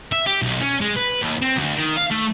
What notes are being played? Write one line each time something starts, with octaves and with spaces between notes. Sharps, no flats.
E5
G4
B1
C#4
G#3
B4
D#2
C4
D2
D#3
F5
A3